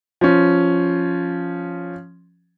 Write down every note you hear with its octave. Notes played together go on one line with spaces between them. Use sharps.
F3 C#4